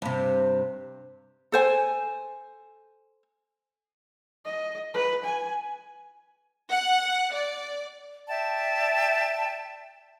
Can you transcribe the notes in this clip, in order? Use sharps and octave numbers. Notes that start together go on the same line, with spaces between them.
G2 C3
A4 C5 G#5
D#5
B4
G#5
F#5
D5
D5 E5 G5 A5